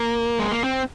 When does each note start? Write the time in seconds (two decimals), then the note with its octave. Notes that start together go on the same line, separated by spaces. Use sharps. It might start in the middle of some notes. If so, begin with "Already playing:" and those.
Already playing: A#3
0.39 G#3
0.51 A#3
0.64 C4